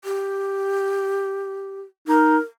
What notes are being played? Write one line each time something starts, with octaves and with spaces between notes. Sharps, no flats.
G4
D#4 A#4